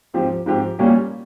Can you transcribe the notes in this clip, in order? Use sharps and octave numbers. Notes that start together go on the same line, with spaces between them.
G#2 F3 C4 G4
G#2 F3 C4 G4
A#2 G3 A#3 C#4 G4